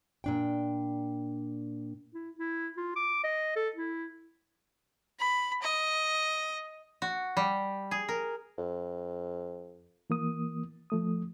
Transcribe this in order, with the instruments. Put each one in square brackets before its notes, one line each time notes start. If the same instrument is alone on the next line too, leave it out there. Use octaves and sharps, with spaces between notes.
[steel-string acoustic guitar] A#2 D4 G5
[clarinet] E4
E4
F4
D6
D#5
A4
E4
[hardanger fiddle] B5
D#5
[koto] F#4
G3
G#4
A#4
[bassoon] F2
[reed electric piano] E3 A#3 D#6
F3 A3 D#6